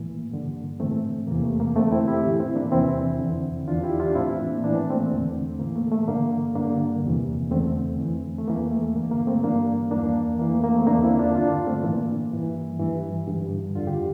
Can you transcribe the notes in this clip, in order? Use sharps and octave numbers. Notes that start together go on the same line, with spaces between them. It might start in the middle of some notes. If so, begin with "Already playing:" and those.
Already playing: A2 E3 A#3
G2 D3
A2 E3 A3 C4
E2 C3 E3 A#3
A3
A#3
F2 D3 A3 C4
C4 E4
E4 G4
A2 E3
C4 E4
A#3 D4
E2 C3 E3 C4 E4
F2 D3
E2 E3 D4 F4
E4 G4
D4 F4
A2 E3 C4 E4
A#3 D4
A2 E3 D4
C4
A#3
A3 C4
E2 D3
A2 E3 A#3
A3
A3
G2 D3 A#3
G2 D3 A#3 D4
E2 C3 E3
E2 D3 A3 C4
F2 E3
A3
E2 E3 A#3
A3
G2 D3 A#3
A#3
A3 C4
G2 E3 A#3 D4
E2 E3 A#3 D4
F2 E3 A#3
A3
A#3
A3 C4
E2 D3 A#3 D4
C4 E4
D4 F4
G2 D3 D4 F4
A3 C4
A2 E3 A#3
G2 E3
G2 E3
G2 D3
F2 D3 F4
G4